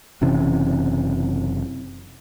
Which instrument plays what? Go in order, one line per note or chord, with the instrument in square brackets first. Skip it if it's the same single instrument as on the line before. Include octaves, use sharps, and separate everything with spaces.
[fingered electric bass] F#1 C3 E3 C#4